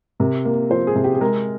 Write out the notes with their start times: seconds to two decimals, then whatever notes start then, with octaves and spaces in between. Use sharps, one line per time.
0.20 C3 A#4
0.45 A#3
0.70 F3 C5
0.87 G#4
0.95 C3
1.04 G4
1.14 G#4
1.21 G#3 A#4